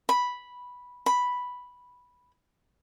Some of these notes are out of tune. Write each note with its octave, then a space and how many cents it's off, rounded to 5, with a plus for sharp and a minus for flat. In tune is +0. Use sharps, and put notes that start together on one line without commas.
B5 -5
B5 -5